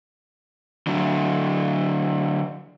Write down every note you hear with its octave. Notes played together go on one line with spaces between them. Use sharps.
D3 F#3